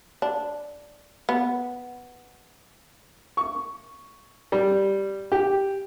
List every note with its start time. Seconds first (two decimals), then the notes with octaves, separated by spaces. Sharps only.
0.22 D4
1.29 B3
3.37 C#6
4.52 G3
5.32 G4